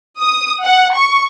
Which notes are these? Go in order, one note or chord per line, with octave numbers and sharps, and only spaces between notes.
D#6
F#5
C#6